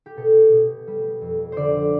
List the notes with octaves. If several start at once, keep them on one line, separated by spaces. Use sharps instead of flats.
G4
B2 A4
B2
G3
F2
D3 C5 D5